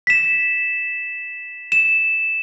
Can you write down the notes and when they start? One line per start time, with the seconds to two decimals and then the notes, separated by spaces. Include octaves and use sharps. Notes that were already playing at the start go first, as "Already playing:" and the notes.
0.07 B6 E7
1.72 E7